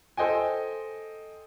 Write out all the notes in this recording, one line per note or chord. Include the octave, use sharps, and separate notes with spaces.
A4 C5 D#5 G5 G#5